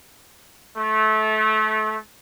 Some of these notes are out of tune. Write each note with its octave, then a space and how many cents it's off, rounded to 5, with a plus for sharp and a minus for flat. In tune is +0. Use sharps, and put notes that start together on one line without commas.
A3 -25